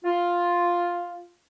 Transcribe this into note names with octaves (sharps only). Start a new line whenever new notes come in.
F4